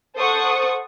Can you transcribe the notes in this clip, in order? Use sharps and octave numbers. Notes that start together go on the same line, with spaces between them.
A4 C5 F#5 C#6 D#6